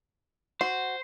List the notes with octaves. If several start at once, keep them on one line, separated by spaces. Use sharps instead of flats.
F#4 C5